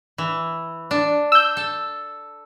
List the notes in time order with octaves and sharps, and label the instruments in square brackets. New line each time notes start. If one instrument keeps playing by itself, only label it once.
[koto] E3
D4
[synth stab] E6 G6
[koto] A4